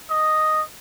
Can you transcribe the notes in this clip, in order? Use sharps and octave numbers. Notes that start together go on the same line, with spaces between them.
D#5